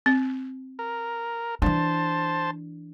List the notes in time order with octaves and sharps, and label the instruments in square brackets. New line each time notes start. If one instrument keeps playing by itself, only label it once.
[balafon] C4
[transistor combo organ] A#4
[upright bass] E3 D4 [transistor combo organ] C5 A5